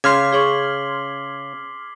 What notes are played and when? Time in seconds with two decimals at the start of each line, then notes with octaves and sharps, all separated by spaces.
0.04 C#3 C6 D6 F6 G#6 B6 C7
0.33 G#4 C#5 C#6 F#7 G7